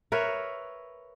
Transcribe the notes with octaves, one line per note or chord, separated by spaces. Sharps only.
A#4 B4 C#5 E5